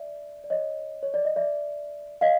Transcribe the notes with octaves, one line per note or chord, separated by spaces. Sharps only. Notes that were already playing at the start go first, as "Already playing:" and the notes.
Already playing: D5 E5
D5
C#5 D#5
C#5
D5
D#5
D5 E5
D#5 F5